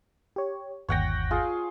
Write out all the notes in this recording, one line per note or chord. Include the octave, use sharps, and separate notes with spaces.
G4 C#5
G1 D#2 C#5 F#5 G5 A#6
F4 G#4